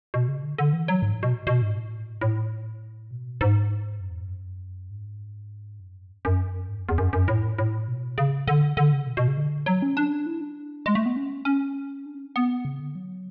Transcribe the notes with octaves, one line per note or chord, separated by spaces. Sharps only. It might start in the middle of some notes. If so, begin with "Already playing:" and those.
B2
C#3
D3
D3
E3
F#3
G#2
A2
B2
B2
G#2
A2
A2
B2
G#2
F#2
E2
F#2
G#2
F#2
F#2
G#2
F#2
E2
F#2
F#2
A2
A2
B2
C#3
D3
D3
C#3
B2
B2
C#3
D3
F#3
C#4
D4
E4
D4
G#3
A3
B3
C#4
C#4
D4
C#4
B3
C#3
D3
F#3